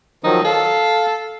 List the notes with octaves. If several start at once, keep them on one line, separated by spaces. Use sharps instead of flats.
D#3 F3 F#3 D#4
A4 F5